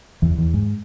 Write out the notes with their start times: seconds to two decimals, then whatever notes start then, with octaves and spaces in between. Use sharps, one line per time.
0.22 E2 E3
0.38 E2 E3
0.54 G#2 G#3